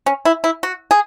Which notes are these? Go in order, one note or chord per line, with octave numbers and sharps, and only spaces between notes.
C#4
E4
E4
F#4
G#4